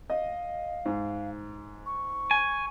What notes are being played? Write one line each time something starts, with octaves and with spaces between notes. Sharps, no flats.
D#5 F5
G#2
C#6
G#5